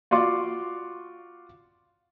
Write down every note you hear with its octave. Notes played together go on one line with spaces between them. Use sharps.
F4 F#4 D5 C6 D6